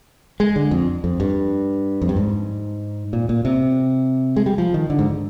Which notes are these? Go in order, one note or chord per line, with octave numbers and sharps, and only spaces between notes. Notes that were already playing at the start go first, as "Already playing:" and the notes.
G#3
D3
F2
F2
G2
F2
G2
G#2
A#2
A#2
C3
G#3
G3
F3
D#3
D3
G#2